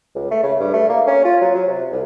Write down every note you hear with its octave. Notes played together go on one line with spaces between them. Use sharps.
C#2
A3
C#3
G2
A3
A#3
C#4
F4
F#3
F#3
C3
C2